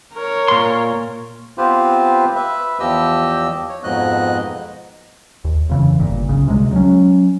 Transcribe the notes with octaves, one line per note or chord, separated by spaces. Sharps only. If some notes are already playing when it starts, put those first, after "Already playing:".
A#4 C#5
A#2 C6
B3 C4 F4 G4 B4 C5
B4 E5
E2 F3 G4 D#5 E6
C#5
F2 G#2 B2 D#5 F#6
D#2
F2 C#3 E3
G1 A#2
B1 C#3
D2 C3 D#3 G#3
F#3 C#4